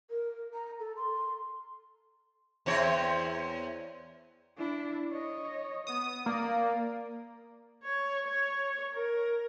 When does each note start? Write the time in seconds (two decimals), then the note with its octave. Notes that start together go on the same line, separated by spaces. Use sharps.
0.10 A#4
0.54 A#5
0.79 A4
0.96 C6
2.66 E2 C4 C#5
4.57 D4 E4
5.11 C#5 D#5
5.87 B3 D#6
6.26 A#3 D5
7.83 C#5
8.26 C#5
8.94 A#4